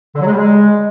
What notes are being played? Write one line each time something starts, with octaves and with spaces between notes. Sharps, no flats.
D3
F#3
G#3
G3
G#3